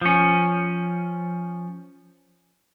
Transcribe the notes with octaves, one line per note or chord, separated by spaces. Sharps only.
F3 C#4